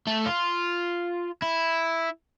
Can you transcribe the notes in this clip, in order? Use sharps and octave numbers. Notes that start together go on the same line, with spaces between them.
A3
F4
E4